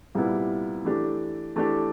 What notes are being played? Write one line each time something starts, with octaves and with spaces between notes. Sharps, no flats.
C2 A#2 G3 B3 E4
E3 A3 D4 G4
E3 A3 D4 G4